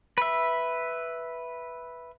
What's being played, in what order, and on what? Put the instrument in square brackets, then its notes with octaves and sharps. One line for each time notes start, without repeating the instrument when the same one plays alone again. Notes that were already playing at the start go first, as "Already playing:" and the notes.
[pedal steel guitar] B4 E5